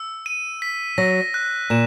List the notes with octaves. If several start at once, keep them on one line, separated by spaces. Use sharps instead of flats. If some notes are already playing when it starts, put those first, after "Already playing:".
Already playing: E6
D#7
B6
F#3 A#6
F#6
A#2 E7